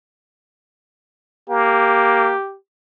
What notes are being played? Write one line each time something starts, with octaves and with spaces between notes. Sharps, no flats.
A#3 G4